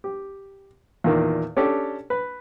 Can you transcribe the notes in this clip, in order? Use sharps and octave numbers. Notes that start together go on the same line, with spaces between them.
G4
E2 A#2 D#3
C#4 D4 G4 A4
B4